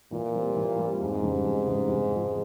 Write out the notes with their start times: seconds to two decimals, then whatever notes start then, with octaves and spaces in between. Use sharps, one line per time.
0.12 A#2 E3
0.35 G3 C4
0.56 E3
0.79 G3 C4
1.01 F2 G#2
1.23 C#3 E3 G3
1.45 F2
1.67 C#3 E3 G3
1.89 C3
2.11 F3 G#3 C4 F4